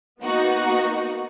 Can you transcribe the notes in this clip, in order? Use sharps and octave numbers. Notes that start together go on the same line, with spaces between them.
A#3 B3 D#4 F#4